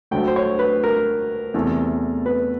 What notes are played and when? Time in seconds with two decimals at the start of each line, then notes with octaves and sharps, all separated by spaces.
0.11 D2 D3 F#3 A3 G5
0.28 C5
0.36 C#5
0.59 B4
0.84 A#4
1.54 E2 C3 E3 A3
2.26 B4